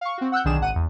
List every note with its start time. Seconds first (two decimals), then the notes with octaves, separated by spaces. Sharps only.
0.01 F5 C#6
0.18 C4 F#4
0.32 F#5 E6 F#6 G6
0.45 B1 D3 D#3 D4 G#4 E7
0.60 G#1 F#5 D#7
0.75 E2